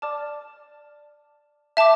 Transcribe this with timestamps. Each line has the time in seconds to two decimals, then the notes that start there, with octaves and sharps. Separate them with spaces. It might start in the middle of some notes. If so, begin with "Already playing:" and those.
0.02 D5 A5 D6 F6
1.77 E5 A5 D6